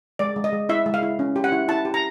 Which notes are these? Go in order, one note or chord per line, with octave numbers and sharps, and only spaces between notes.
G#3 D5
G#3
D#5
G#3
E4 E5
G#3
F5
E4
C#4
G4
F#5
E4
E4 A5
G4
A#5